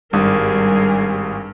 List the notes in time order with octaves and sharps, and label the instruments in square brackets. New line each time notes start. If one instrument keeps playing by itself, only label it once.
[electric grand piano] G#1 D#6 [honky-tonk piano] G2 [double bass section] G3 [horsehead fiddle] G#4 A#4